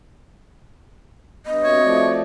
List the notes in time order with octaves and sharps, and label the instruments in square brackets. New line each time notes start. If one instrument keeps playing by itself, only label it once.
[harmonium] G2 [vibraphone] B3 [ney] D#5
[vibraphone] C4 F#4 E5 [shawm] C#5
[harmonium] F3 A3 D5